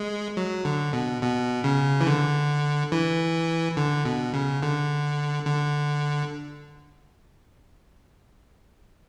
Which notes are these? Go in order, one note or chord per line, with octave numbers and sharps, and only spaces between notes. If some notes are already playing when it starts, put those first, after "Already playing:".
Already playing: G#3
F#3
D3
B2
B2
C#3
E3
D3
E3
D3
B2
C#3
D3
D3